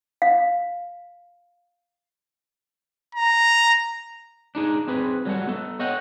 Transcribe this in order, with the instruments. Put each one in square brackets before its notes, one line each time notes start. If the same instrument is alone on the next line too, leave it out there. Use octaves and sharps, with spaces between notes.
[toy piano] F5
[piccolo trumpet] A#5
[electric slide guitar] D4 D#4 G#4
C4 G#4 B4
F#3 G3 A4 F#5
B3 A4
C#5 D#5 F#5 G5